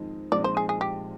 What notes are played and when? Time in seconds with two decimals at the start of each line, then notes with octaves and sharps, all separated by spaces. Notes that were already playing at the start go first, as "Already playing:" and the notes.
Already playing: F2 D#3 G#3 C4 D#4
0.32 A#1 A#2 G#3 C4 D#4 D5
0.44 C5
0.57 G#4
0.69 G#4
0.81 G4